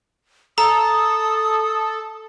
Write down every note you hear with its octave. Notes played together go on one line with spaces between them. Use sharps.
A4 A#5 D#6